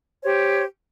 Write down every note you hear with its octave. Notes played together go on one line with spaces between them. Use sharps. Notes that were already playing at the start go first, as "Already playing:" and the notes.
G4 C5 C#5